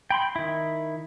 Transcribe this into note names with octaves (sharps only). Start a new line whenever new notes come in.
G5 B5 C6
D#3 E4